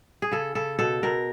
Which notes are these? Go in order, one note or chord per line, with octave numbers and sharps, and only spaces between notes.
G#4
C#3 A4
C#3 A4
B2 A4
B2 A#4